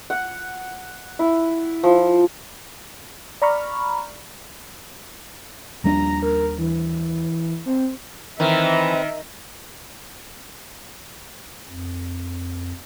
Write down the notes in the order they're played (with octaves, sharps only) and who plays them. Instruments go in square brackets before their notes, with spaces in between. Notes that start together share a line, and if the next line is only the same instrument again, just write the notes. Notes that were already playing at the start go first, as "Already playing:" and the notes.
[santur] F#5
E4
F3
[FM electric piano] D5 A#5 B5 C#6 F6
[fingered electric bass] D#2 G3 D4 [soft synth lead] A#5
[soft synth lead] A#4
E3
C4
[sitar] D#3 [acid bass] E3 [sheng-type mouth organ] C4 B4 A#5 [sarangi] E5
[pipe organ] F2